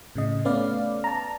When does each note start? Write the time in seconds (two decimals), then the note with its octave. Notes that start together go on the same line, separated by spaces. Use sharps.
0.16 A2 C#3 D#5
0.45 A3 B3 C#4 B4 D5 F5
1.04 A5 A#5